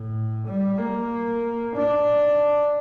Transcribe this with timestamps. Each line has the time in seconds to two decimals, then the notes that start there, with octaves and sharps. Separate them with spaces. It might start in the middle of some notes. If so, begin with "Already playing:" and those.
Already playing: A2
0.46 G3
0.78 A#3
1.75 D4